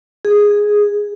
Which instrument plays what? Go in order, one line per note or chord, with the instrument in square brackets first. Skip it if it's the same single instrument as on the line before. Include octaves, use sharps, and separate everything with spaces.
[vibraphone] G#4